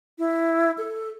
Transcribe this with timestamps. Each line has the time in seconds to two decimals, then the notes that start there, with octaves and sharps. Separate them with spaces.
0.19 E4
0.78 A4